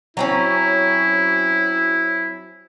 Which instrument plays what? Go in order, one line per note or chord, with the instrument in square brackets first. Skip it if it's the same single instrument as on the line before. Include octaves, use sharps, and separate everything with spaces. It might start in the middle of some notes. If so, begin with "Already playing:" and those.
[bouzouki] F#3 C4 C#4 [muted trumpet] E4